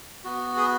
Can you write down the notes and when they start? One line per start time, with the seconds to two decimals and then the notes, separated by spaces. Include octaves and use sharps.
0.24 B3 F#4
0.57 G#4